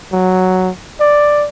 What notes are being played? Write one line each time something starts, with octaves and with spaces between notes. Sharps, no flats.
F#3
D5